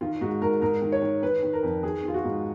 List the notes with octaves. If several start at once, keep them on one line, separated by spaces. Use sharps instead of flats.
D#3 F4
G#2 F#4
G#2 A#4
G#2 A#4
D#3
C#5
D#3
D#3 B4
D#3
A#4
F2
D#3 G#4
D#3 F4
F#4
G#2